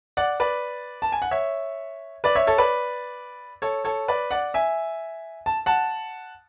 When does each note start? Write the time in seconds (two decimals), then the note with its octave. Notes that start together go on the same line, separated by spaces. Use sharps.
0.17 D5 F#5
0.40 B4 D5
1.02 A5
1.12 G#5
1.22 F#5
1.31 C#5 E5
2.24 B4 D5
2.35 C#5 E5
2.47 A4 C#5
2.58 B4 D5
3.62 A4 C#5
3.85 A4 C#5
4.08 B4 D5
4.31 D5 F#5
4.54 E5 G#5
5.46 A5
5.66 F#5 A5